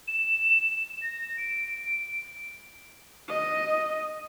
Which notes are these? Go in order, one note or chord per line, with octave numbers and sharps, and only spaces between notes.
E7
A#6
D7
D#5